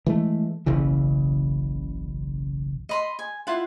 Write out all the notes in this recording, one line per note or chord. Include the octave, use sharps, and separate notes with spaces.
E3 G#3 A3
F#1 B1 C#3 E3
D#5 B5 C6
G#5
E4 F4 F#5